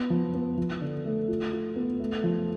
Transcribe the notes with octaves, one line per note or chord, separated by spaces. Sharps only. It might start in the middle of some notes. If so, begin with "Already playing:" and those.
Already playing: B3
F3
B3
F3
D3
A3
F4
F4
B3
A3
F3